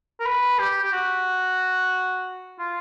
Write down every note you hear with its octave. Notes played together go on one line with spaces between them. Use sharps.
A#4
B4
G4
G4
F#4
F4